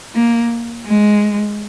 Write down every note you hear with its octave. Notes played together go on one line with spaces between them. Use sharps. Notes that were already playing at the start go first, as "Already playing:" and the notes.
A#3
G#3